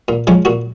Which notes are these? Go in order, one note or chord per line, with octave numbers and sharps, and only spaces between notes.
A#2
F3 G#3 C#4
A#2 F#4